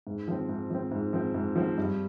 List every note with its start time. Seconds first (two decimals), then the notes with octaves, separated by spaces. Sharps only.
0.07 G#2
0.28 F3 C4
0.49 G#2
0.70 F3 C4
0.92 G#2
1.13 F3 C4
1.34 G#2
1.55 F3 C4
1.78 G2